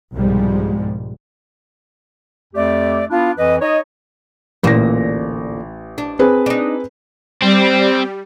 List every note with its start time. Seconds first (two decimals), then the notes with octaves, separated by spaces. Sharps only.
0.13 C2 G#2 B2 F3 G3 G#3
2.54 F2 A3 G4 D5
3.09 B3 D4 E4 F4
3.37 F2 E3 B4 D#5
3.60 D#4 C#5 D#5
4.63 A1 D2 A#2 A#3 A#6
5.98 D4
6.19 C4 G#4 B4
6.46 D4 D#4
7.42 G3 C4